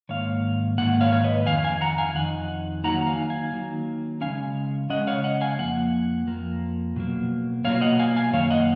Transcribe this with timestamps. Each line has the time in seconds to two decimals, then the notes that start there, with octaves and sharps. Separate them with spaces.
0.09 G#2 D#3 A#3 C#5 F5
0.78 G#2 D#3 A#3 F#5
1.01 C#5 F5
1.12 C#5
1.24 B4 D#5
1.46 F2 D#3 F5 G#5
1.64 F5 G#5
1.81 F#5 A#5
1.98 F5 G#5
2.15 F2 D#3 D#4 F#5
2.84 D#3 F#3 A#3 D#4 F#5 A#5
3.07 F5 G#5
3.30 F5 G#5
3.53 D#3 F#3 A#3 D#4
4.21 C#3 G#3 C#4 F5 G#5
4.90 C#3 G#3 C#4 D#5 F#5
5.07 C#5 F5
5.24 D#5 F#5
5.41 F5 G#5
5.59 F2 F3 A#3 F#5
6.27 F2 F3 A#3
6.96 B2 F#3 A#3
7.64 B2 F#3 A#3 C#5 F5
7.81 D#5 F#5
7.99 F5 G#5
8.16 F5 G#5
8.33 F#2 D#3 A#3 C#5 F5
8.50 D#5 F#5